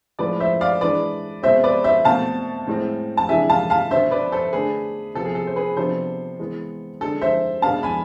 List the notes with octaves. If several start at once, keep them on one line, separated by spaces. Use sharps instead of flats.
A2 F3 G#3 B4 D5
C5 E5
D5 F5
E3 G#3 D4 B4 D5
B2 G#3 C4 C5 E5
B4 D5
C5 E5
B2 A3 C4 F5 A5
A2 G#3 C4
A5
C3 E3 G#3 D4 E5 G#5
F5 A5
F5 A5
B2 B3 D4 C5 E5
B4 D5
A4 C5
D3 A3 D4 G#4 B4
C3 F3 B3 A4
G#4
A4
C5
G#4 B4
C3 F3 B3 D4 A4 C5
E3 G#3 B3
D3 G#3 D4 A4
C5 E5
B2 G#3 B3 D4 F5 A5
G#5 B5